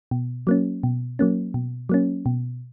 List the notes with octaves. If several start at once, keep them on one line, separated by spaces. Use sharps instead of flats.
B2
F#3 A#3 C#4
B2
F#3 A#3 C#4
B2
F#3 A#3 C#4
B2